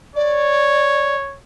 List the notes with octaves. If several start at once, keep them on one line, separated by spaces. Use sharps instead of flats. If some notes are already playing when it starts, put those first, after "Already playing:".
C#5 D5